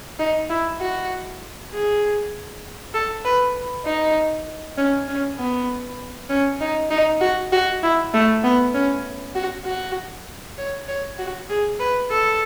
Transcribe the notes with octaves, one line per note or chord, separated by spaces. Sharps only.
D#4
E4
F#4
G#4
A4
B4
D#4
C#4
C#4
B3
C#4
D#4
D#4
F#4
F#4
E4
A3
B3
C#4
F#4
F#4
C#5
C#5
F#4
G#4
B4
A4